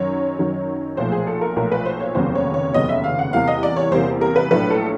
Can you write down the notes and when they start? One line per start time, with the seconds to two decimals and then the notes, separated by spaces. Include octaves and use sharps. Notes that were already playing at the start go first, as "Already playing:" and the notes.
Already playing: F#2 D#3 F#3 C#5
0.39 F#2 D#3 F#3
0.97 B1 A#2 F3 A3 C5
1.12 G#4
1.27 A4
1.41 A#4
1.56 B1 A#2 F3 A3 A#4
1.72 B4
1.86 C5
2.00 C#5
2.15 F1 D#2 C#3 F#3 B3 C5
2.35 C#5
2.54 C#5
2.74 F1 D#2 C#3 F#3 B3 D#5
2.89 E5
3.04 F5
3.19 F#5
3.33 E2 C3 E3 G3 A#3 F5
3.48 D#5
3.63 D5
3.76 C#5
3.92 E2 C3 E3 G3 A#3 C5
4.21 A#4
4.36 B4
4.51 A#1 A2 F#3 A3 D4 B4
4.70 A4